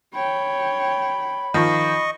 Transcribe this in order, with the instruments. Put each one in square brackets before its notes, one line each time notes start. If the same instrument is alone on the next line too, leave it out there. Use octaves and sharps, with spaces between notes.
[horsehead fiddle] C#5 G5 [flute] B5
[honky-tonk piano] D#3 F3 [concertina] D#5 C#6